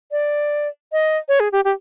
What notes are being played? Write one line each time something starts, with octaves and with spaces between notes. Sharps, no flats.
D5
D#5
C#5
G#4
G4
G4